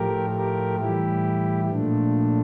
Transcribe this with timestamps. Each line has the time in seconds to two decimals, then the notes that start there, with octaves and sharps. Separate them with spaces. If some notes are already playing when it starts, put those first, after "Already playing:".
Already playing: A2 F3 A3 G4 A#4
0.35 G4 A#4
0.79 A2 E3 G3 E4 G4
1.70 A#2 F3 A3 D4